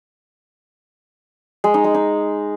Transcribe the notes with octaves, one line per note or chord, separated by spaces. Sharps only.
G#3
D#4
G#3
D#4